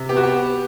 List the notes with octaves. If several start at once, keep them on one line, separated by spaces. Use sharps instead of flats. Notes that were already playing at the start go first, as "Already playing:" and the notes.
Already playing: C3
B3 G4
F#4
G4
B3